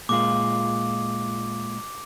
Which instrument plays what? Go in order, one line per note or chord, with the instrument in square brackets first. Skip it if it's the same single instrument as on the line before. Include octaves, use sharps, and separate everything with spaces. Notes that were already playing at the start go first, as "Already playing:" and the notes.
[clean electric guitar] A#2 G#3 F4 [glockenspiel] D6